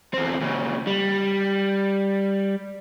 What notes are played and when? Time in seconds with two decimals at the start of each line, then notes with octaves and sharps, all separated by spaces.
0.14 E2 C4
0.42 A#2 C#3
0.87 G3